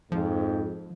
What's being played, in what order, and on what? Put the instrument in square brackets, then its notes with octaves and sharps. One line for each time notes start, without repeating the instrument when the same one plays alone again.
[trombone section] F2 G#2 [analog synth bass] F3